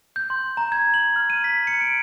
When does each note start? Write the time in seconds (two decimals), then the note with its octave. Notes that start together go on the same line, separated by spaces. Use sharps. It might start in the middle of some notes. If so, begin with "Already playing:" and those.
0.16 G6
0.30 C6
0.57 A#5
0.72 G#6
0.94 F#7
1.16 F6
1.30 D#7
1.44 B6
1.67 C#7
1.81 D7